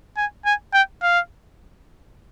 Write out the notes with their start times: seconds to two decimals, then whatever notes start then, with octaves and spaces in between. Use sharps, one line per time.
0.17 G#5
0.45 G#5
0.74 G5
1.02 F5